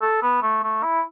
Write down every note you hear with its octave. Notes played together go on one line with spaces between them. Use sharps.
A4
B3
A3
A3
E4